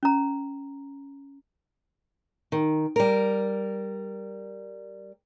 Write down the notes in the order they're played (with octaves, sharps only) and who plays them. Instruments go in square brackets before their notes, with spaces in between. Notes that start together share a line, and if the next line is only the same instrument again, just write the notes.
[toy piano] C#4 A#5
[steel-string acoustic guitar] D#3
G3 A#4